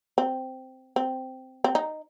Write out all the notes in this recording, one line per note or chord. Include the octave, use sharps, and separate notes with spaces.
C4
C4
C4
D#4